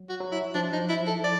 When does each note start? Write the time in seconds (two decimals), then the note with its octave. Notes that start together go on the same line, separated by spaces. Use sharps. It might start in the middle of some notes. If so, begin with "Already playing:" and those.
Already playing: F#3
0.09 F#4
0.20 F#3
0.32 E4
0.55 F3 D4
0.73 D#4
0.89 E4
1.07 A4
1.24 D5